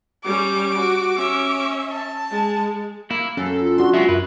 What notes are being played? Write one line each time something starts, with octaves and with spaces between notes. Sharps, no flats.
G3 C#4 D6
F#4
C#4 E5
A5
G#3
A#3 E4
F#2 C#4 A4
F4
D4 F#4 C6
F#3 G#3 B3 E5
F#2 B4